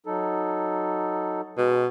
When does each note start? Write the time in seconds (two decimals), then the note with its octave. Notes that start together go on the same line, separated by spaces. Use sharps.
0.06 F#3 D#4 A4
1.57 B2 G#3